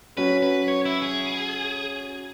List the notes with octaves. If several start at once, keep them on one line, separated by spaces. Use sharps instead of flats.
F#3 C#4 F#4 B4
B4
C#5
E4
G#4